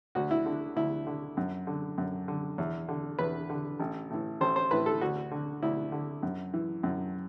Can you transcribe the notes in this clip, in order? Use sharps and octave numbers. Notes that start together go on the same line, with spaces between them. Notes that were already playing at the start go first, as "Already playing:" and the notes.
D2 F#4
E4
D3
D2 E4
D3
F#2
D3
F#2
D3
E2
D3
E2 B4
D3
A1
A2 E3
A1 C5
C5
A2 E3 B4
A4
D2 F#4
D3
D2 E4
D3
F#2
E3
F#2